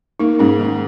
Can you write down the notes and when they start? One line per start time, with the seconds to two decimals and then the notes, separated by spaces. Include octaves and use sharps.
0.20 A#3 D#4
0.39 G#2 C#4
0.60 D#3